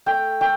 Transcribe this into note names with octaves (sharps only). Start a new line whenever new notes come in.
A3 G5
A3 G5